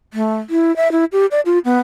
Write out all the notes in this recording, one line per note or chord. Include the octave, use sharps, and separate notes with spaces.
A3
E4
E5
E4
G4
D5
F4
B3